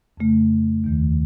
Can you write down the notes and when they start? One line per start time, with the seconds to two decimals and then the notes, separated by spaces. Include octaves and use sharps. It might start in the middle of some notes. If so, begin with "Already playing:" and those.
0.17 F2 C#3 A3
0.84 D#2 D#3 A3